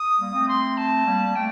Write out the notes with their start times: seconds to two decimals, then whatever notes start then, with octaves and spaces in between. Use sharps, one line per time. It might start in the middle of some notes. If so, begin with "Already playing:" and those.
Already playing: D#6
0.19 G3 A#3
0.33 A3 C4
0.48 C6
0.77 A5
1.06 G3 A#3
1.36 A3 G5